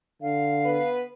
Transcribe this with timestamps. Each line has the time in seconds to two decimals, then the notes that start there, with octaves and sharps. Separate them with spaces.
0.22 D3 F5
0.65 B3 B4